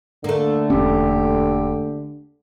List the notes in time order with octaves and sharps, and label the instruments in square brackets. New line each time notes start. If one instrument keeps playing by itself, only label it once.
[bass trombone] D3 [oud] A3 A#3
[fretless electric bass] E1 C#4 [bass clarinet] G4